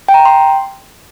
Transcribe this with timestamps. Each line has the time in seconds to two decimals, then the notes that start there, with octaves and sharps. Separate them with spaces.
0.08 G5
0.14 A#5
0.20 G5
0.25 C6